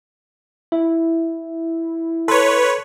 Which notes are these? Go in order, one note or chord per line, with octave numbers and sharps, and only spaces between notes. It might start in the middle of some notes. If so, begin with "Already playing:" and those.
E4
A4 B4 C#5 C6